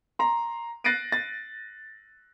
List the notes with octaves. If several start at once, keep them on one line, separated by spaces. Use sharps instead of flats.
A#5 C6
F#6 A6 A#6 C7 D7 D#7
A6